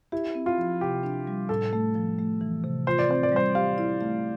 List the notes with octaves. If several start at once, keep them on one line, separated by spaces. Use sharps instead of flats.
E4 G4
C4
F4
F3
C3 G4
D4
G3
A2 A4
A3
F3
A3
E3
C3
F4 C5
D5
C4 C5
D5
G3 C5
G4 F5
E4
A3